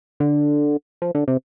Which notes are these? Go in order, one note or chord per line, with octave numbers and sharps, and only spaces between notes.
D3
F3
D3
C3